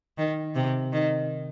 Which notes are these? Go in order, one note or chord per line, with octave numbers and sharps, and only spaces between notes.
D#3
C3
D#3